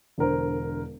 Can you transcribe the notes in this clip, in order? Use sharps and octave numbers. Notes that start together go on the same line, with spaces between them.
E1 D3 A#4 C5